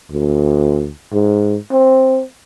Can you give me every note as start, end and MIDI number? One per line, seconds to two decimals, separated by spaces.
0.11 0.90 38
1.13 1.57 44
1.71 2.22 60